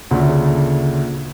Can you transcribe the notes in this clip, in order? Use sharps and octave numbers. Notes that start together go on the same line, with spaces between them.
D2 A#2 C#3 A3